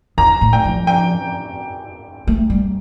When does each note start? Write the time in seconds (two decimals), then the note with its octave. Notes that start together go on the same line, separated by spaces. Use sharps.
0.18 F2 A#5
0.41 A2
0.53 G5
0.65 F3
0.87 G5
2.27 A3
2.50 G3